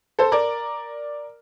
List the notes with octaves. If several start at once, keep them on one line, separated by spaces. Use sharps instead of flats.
A4 C5
A#4 D5